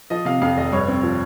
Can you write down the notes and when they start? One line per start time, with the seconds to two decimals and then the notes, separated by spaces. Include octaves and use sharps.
0.10 F3 D#5
0.25 C3 F5
0.41 F2 F5
0.57 F1 D#5
0.72 G2 C#5
0.88 C4
1.03 F3